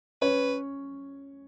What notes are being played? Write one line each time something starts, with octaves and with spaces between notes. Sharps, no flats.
C#4 B4 C#5